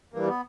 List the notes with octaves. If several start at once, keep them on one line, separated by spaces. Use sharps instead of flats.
G2 E3 G3 A#3
B3